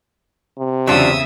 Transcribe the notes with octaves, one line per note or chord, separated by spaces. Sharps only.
C3
E2 C#3 F#3 D4 F4 E5 D#6 E6